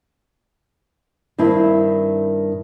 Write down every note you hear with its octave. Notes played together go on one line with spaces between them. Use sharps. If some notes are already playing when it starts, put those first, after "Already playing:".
G2 D#3 C4 E4